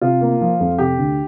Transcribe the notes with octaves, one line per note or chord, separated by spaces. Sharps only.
C3 F4
A#3
F3
F2
C3 G4
D2